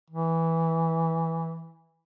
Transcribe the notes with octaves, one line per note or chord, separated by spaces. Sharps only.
E3